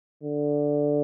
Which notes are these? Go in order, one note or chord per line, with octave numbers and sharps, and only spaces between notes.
D3